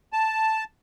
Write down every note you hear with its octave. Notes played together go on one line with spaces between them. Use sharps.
A5